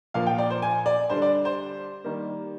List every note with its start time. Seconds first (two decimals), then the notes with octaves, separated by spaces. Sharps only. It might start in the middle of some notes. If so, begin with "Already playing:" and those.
0.14 A#2 F3 A#3 F5
0.27 G5
0.38 D5
0.50 C5
0.62 G#5
0.86 D5
1.10 D3 G3 D4 C5
1.22 D5
1.45 C5
2.04 D#3 G3 A#3